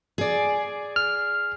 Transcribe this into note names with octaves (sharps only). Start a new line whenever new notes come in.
G#4 D5
F6